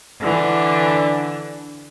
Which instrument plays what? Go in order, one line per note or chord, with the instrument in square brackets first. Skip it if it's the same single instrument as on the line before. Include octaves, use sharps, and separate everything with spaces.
[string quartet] D3 E3 D4